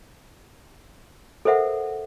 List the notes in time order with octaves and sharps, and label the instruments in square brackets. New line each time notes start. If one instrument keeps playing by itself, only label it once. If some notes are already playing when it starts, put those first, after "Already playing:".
[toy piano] A4 A#4 C5 E5 F#5